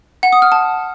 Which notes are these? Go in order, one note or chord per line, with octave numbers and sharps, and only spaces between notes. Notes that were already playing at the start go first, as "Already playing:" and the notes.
F#5
D#6
F6
A5